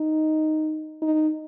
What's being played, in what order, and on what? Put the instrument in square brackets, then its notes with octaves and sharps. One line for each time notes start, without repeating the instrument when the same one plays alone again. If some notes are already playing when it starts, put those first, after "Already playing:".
Already playing: [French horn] D#4
D#4